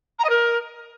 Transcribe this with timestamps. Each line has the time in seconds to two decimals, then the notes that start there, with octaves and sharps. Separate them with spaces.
0.19 A#5
0.24 D#5
0.29 A#4